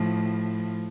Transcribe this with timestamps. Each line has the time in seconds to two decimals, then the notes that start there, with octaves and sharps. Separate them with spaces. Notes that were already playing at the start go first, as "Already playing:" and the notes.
Already playing: A2 F3